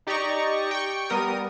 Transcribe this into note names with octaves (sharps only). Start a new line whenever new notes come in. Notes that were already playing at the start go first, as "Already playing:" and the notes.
D#4 G4 D5 D#5 A#5 C#6
G5 C#6
G3 B3 A#4 D#6